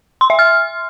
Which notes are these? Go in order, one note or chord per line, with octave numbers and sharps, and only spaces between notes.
C6
E5
F6